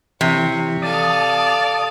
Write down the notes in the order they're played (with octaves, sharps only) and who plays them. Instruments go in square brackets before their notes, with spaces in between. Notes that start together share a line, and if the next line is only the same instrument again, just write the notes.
[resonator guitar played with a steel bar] C3 [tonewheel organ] E3 [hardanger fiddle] C#5
[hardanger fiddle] A4 F5 [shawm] D5 [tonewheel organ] A5 D#6